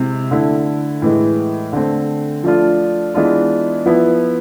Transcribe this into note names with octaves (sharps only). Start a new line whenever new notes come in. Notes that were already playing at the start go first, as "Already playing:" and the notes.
Already playing: C3 G#3 C4 E4
D3 A3 E4
A2 E3 G#3
D3 A3 C4
F3 A3 D4 F4
E3 G#3 B3 D4 F4
F3 B3 E4